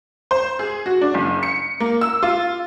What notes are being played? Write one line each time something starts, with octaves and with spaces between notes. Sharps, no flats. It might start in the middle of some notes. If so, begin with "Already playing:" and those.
C5
G#4
F#4
D4
F#1
C#7
A#3
E6
F4